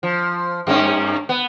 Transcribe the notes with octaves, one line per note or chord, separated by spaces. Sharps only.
F3
G2 A#3 C#4
B3